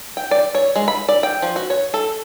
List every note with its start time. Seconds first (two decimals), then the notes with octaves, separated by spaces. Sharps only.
0.17 G5
0.31 D5
0.55 C#5
0.76 G#3
0.88 B5
1.09 D5
1.23 G5
1.42 F3
1.56 F#4
1.70 C#5
1.94 A4